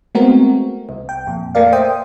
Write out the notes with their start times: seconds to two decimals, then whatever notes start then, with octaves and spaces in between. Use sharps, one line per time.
0.15 G#3 A3 B3 C4 F#4 A#4
0.89 C2
1.09 G5
1.27 F2 A#2
1.55 A3 A#3 A4 A#4 D5 F5
1.72 C5 E5 G5 D#6